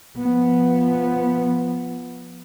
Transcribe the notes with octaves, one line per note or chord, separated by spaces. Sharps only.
F3 B3